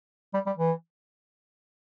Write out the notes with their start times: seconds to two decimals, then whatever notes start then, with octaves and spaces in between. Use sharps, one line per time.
0.34 G3
0.46 G3
0.58 E3